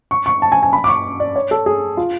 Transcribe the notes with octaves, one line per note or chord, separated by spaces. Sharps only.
C#6
C#6
A5
G#5
G#5
B5
D6
C#6
D5
C#5
A4
G#4
F4